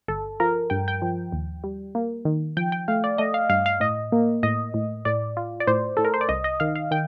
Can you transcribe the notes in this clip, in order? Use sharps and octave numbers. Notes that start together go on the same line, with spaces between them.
G1 A4
F3 A#4
G2 G5
G5
F3
D#2
G3
A#3
D#3
F3 G5
G5
A3 F5
D5
A3 D#5
F5
G2 F5
F5
A2 D#5
A#3
A2 D#5
A2
A2 D5
F4
D5
A2 C5
A2 A4
A#4
C5
D5
C2 D#5
D#5
D#3 F5
F5
D#3 G5